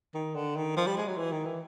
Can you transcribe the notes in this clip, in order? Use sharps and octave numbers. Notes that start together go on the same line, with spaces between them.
D#3
D3
D#3
F3
G3
G#3
F#3
E3
D#3
E3